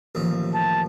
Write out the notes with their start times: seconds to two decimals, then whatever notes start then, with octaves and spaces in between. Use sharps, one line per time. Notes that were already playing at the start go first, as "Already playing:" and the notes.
0.15 A1 D#2 F3
0.54 A5